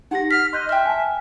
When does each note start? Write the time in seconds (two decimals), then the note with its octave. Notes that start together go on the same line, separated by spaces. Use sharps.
0.11 D#4 G4 F#5 A#6
0.31 F6 B6 C7
0.53 D#5 C6 F#6 G6
0.69 E5 G5 F6
0.86 G#5 A5